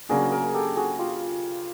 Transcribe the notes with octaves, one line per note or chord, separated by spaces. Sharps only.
C#3 F#3 A#3 D4 F#4 G#4
G#4 A#4
G4 A4
F#4 G#4
F4 G4